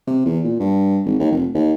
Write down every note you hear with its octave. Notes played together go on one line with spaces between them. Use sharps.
C3
E2
A#2
G2
G#1
D#2
F1
D#2